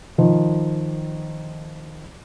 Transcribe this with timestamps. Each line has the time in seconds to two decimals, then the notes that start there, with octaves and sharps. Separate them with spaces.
0.18 D#3 F3